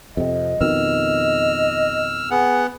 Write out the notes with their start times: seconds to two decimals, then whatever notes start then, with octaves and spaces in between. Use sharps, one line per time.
0.17 F2 C3 D#5
0.61 F2 B2 D#3 E6 F6
2.31 B3 G#4 F#5